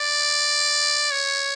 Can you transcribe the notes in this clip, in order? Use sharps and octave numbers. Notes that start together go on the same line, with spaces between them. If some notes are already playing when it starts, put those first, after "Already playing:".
Already playing: D5
C#5